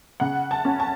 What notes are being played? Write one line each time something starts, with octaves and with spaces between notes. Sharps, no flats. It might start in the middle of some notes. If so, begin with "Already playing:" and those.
C#3 F#5
A5
C#4
A5